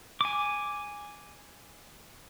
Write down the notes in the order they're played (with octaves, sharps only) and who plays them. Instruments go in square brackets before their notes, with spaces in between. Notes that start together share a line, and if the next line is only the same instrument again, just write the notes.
[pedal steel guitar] G#5 D6